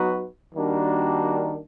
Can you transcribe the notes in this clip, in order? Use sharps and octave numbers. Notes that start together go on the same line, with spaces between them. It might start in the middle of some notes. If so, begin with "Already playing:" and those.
Already playing: F#3 B3 D#4 F#4 B4
D#3 G3 A#3 D4 F#4